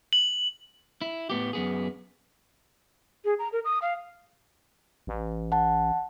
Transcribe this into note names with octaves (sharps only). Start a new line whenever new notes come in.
F#7
E4
A2 B3 G4
F#2 B3 G#4
G#4
A#5
A#4
D#6
F5
A1
F#5 A5